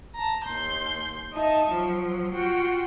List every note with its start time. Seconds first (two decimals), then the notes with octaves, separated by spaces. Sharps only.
0.15 A5 A#5
0.44 D#2 C6 G6
1.33 D#4 D#5 E5 A5
1.71 F3 F#3
2.33 F4 F#4 G5